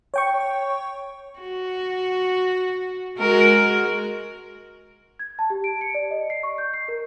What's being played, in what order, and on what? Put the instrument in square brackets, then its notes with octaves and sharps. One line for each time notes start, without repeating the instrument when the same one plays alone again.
[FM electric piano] C#5 G5 C#6
[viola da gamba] F#4
G#3 F#4 A#4
[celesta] G#6
A5
G4
D7
C#7
D5
D#5
C7
C#6
G6
C7
A#4